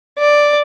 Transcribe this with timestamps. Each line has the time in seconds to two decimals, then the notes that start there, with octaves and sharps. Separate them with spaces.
0.19 D5